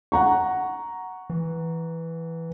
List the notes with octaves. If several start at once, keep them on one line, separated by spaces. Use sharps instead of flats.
F#5 A#5 C#6
E3